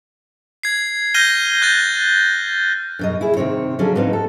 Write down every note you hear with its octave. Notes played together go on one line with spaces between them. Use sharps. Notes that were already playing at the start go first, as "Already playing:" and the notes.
G#6 C7
F6 G6 A#6 D#7 G7
F#6 G6 A6 D#7
F#2 B2 D#5
E4 G#4
C3 D#3 C4 C#5
D3 F3 F#3 C#4 G#4
G#2 B3 C4 D#4 F4
A4